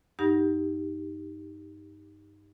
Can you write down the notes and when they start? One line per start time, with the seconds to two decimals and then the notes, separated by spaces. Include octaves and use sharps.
0.19 G2 D#4 G4 F#5 A#6